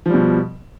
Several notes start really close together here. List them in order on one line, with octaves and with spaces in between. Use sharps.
F3 G3 B2